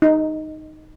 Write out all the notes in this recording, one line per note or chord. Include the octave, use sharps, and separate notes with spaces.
D#4